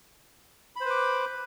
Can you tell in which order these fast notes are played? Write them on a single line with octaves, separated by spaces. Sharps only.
B5 C5 B4 D6